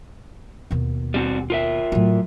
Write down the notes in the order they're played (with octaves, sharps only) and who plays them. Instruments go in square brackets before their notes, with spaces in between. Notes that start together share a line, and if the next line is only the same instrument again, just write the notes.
[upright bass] D#2 B2
[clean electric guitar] G3 C4 F#4
F4 A#4 E5
[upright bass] A2 F#3